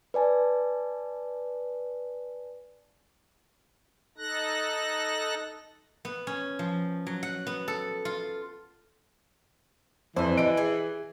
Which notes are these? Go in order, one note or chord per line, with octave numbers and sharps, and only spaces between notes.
B4 D5 G#5 A5
D#4 A4 F#6 A#6
B3
C#4
F3
F#3
F#5
B3
A4
F4
F2 D3 E3 C5
D3 G4 D#5 D7
G#4